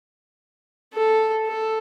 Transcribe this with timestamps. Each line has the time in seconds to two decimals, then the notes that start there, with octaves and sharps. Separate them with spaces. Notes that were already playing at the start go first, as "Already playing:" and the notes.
0.94 A4
1.47 A4